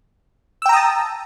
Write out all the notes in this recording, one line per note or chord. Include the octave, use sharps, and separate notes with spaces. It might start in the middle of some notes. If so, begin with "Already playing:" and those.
G5 A5 A#5 D#6 E6